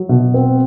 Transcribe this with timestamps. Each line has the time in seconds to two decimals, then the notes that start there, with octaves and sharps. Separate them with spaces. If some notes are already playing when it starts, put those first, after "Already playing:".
Already playing: F#3
0.09 B2
0.34 C4